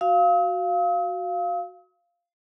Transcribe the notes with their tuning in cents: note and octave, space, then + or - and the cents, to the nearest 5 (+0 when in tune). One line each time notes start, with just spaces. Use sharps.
F#4 +0 F5 -5 D#6 +45